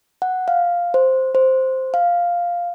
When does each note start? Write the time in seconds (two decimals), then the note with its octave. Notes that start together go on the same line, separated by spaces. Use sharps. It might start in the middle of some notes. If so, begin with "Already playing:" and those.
0.22 F#5
0.48 F5
0.94 C5
1.35 C5
1.94 F5